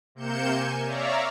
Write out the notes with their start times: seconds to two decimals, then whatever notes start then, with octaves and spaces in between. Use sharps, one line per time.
0.15 C3 A#3 G6 C#7 E7
0.52 G#5
0.85 C#5 D5 E5 F5 A#5